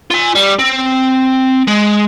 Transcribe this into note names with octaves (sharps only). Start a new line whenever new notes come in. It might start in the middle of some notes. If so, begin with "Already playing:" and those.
F4 G#5
G3
C4
G#3